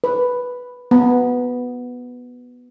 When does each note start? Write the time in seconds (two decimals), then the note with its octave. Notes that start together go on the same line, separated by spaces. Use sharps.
0.04 B4
0.91 B3